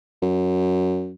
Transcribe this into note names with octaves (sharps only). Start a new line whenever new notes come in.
F#2